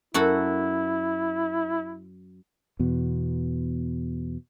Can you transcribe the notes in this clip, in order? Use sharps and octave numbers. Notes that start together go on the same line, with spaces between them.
F#2 E4 F#4 A4
E2 B2